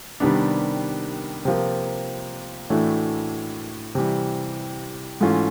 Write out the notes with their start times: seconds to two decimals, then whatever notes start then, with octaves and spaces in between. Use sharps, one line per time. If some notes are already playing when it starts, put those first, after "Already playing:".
0.20 C3 D#3 G3 B3 D4
1.45 C3 F3 A#3
2.70 A2 E3 A3 D4 F#4
3.95 C3 E3 G3
5.21 G#2 E3 A3 C#4 F4